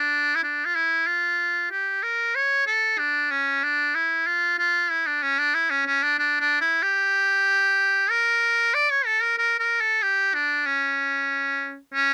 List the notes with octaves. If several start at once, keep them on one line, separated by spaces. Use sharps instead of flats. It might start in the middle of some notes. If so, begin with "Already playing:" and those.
Already playing: D4
E4
D4
F4
E4
F4
G4
A#4
C#5
A4
D4
C#4
D4
E4
F4
F4
E4
D4
C#4
D4
E4
C#4
C#4
D4
D4
D4
E4
G4
A#4
D5
C#5
A4
A#4
A#4
A#4
A4
G4
D4
C#4
C#4